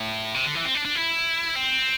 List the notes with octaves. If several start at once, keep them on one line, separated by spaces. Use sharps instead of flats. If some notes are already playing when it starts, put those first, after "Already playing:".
Already playing: A2
C3
D3
E3
C4
D4
D4
E4
C4